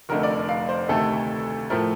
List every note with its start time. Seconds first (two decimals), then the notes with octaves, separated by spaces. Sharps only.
0.09 F1 F2 D3 A3 A#4
0.23 D5
0.49 F5
0.69 C5
0.89 D2 C3 D#3 A3 A4
1.70 A2 F3 A3 A#4